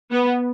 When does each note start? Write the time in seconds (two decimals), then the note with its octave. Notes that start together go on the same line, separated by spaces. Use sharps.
0.11 B3